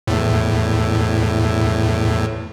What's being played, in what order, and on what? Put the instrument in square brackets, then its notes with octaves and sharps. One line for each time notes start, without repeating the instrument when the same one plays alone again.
[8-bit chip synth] E2 A2